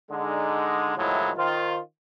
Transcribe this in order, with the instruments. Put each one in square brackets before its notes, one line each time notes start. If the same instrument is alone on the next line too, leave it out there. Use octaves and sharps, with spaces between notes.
[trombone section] D3 G#3 D#4
A2 D#3 F3 F#3 G#3 E4
D#3 F4 C5